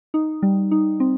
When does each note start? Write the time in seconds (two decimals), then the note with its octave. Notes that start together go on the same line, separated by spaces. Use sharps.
0.14 D#4
0.43 G3
0.71 D#4
1.00 C4